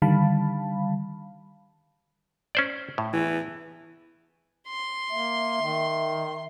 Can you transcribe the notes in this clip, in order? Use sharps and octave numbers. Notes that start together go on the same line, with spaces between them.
D3 D#3 G3 F5 A5 B5
C#4 C5 D5
A2
E3
C6
A#3 E5
D#3